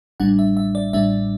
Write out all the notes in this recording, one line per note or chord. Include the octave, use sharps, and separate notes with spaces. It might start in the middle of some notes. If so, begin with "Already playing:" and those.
A1 A2 G3 D4 F#5
E5
E5
D5
A1 A2 G3 D4 E5